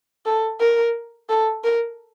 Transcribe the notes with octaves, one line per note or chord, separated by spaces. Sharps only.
A4
A#4
A4
A#4